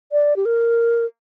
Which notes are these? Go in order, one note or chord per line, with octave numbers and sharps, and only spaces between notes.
D5
G4
A#4